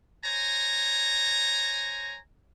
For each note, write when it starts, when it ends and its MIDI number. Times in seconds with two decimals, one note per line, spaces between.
0.24 2.17 72
0.24 2.17 73
0.24 2.17 80
0.24 2.17 82